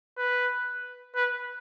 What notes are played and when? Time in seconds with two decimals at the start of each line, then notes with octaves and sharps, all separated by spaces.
0.17 B4
1.15 B4